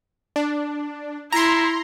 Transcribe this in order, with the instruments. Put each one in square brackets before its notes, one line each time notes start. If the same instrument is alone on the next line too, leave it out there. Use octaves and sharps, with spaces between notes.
[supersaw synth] D4
[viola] E4 [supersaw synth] A#5 C6